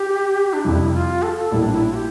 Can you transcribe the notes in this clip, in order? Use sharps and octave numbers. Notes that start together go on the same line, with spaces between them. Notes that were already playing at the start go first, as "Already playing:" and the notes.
Already playing: G4
D4
F2 C3 G3 E4
F4
A4
A#1 A2 G3 A#3 E4
D4
E4
G4